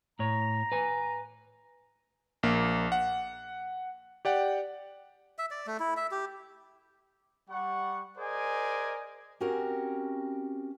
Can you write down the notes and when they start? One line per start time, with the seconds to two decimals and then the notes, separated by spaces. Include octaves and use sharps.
0.19 A2 C#5 A#5
0.72 B4 G#5
2.43 A#1 A#3
2.92 F#5
4.25 G4 D5 F#5 G5
5.39 E5
5.51 D5
5.67 A3
5.80 E4
5.97 E5
6.11 G4
7.49 G3 F#5 C#6
8.18 G#4 A#4 C5 D5 D#5 G#5
9.40 C4 C#4 F#4 G4 A#4 F#5